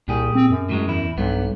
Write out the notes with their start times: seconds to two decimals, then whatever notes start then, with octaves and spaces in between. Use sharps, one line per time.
0.08 C2 A#2 G4 G#4
0.35 C4
0.51 F#2
0.69 A2 F#3 G#3
0.88 E2 E4
1.18 B1 G2 B3